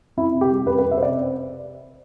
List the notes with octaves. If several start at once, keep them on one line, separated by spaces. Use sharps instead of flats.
F2 E4
C3
G4
G3
F2 B4
B4
F2
E5
C3 C5 D5